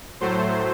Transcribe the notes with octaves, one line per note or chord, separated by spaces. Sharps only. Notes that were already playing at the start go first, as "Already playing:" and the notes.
A2 F#3 A3 C5